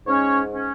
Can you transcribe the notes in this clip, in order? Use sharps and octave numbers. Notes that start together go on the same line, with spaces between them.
G#2 C#4 C#5
C#4